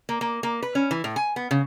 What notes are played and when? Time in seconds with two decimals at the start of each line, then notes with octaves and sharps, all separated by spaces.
0.09 A#3
0.21 A#3
0.43 A#3
0.62 B4
0.75 C#4
0.91 E3
1.04 A2
1.16 G#5
1.36 B3
1.51 C#3